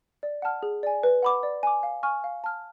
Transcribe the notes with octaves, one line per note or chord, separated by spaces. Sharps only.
D5
F#5 A5 F6
G#4
D5 G#5
B4
F#5 B5 D6
D5
G#5 D6
F5
G#5 C#6 F6
F5
A5 F6